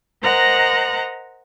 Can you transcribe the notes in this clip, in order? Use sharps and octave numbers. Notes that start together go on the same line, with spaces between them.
A#4 C5 D#5 F#5 A#5 F#6